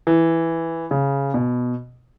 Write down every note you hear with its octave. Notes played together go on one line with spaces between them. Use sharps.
E3
C#3
B2